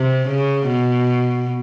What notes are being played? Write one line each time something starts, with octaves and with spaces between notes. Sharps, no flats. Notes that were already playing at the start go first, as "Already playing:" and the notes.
Already playing: C3
C#3
B2